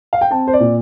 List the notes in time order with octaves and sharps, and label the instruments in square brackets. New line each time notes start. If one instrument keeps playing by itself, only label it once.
[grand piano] F5
G5
C4 A5
C5
D5
A#2